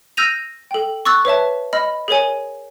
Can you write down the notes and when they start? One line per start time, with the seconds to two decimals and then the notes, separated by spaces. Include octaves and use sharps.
0.17 E6 F6 G6 A#6 D#7 F7
0.71 A4 G5
1.05 C#6 D6 E6 F#6 A6
1.25 B4 C#5 E5 A5
1.73 D#5 B5 F6
2.08 G#4 A#4 C#5 G#5